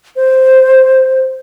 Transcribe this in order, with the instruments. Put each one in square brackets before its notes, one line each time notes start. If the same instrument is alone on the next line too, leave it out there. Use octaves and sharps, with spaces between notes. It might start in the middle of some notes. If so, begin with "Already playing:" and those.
[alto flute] C5